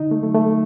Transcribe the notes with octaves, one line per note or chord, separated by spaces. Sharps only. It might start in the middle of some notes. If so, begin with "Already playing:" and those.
Already playing: D3 D#4
A3
F#3 A3
A3